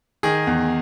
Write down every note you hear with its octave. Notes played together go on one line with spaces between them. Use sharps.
D#3 G#4
E2